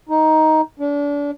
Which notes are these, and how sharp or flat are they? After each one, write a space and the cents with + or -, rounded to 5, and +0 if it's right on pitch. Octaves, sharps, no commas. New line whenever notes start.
D#4 +10
D4 -30